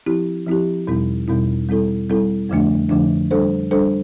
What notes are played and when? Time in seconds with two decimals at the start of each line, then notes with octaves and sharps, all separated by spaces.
0.06 F3 C4 E4 G4
0.47 F3 C4 E4 G4
0.87 E2 B2 G3 C4 E4
1.28 E2 B2 G3 C4 E4
1.69 G3 C4 E4 A4
2.10 G3 C4 E4 A4
2.49 F2 D3 F3 A3 D4
2.90 F2 D3 F3 A3 D4
3.31 G3 D4 A4 C5
3.71 G3 D4 A4 C5